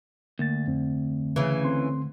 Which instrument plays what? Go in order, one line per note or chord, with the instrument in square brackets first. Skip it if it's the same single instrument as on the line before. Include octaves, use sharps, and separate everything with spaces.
[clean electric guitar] D2 [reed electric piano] A#3 A6
[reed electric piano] F2 C4
[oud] C#3 E3
[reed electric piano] A3 C4 C6